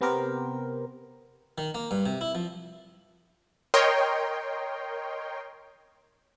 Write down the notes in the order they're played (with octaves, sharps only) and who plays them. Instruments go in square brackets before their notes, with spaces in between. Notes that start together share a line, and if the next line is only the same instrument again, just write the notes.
[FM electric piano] C3 B3 G4 A#4 C5
[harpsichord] D#3
A#3
G2
C3
E4
F3
[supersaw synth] A#4 C#5 D#5 G5 C6